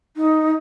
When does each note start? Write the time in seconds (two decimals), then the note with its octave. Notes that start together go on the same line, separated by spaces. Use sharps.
0.16 D#4